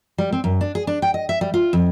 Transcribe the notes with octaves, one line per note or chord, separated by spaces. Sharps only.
G3
C4
F#2
D4
G#4
D4
G5
D#5
E5
G3
F4
F2